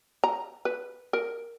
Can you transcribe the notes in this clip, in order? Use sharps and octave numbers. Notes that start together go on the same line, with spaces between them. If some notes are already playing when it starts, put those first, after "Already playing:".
A#5
B4
A#4